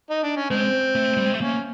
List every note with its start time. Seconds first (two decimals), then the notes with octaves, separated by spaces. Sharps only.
0.10 D#4
0.23 D4
0.36 C#4
0.50 G#3 C4
0.95 A3
1.17 G3
1.26 G#3
1.33 A3
1.41 A#3 C#4